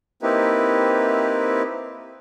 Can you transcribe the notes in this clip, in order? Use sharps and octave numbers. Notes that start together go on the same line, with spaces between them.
A#3 C4 D#4 E4 G4 B4